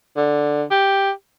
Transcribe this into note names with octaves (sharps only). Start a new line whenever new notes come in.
D3
G4